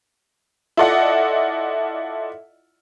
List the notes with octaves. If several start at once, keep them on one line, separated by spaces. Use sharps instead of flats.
E4 F4 A4 D5 D#5 F#5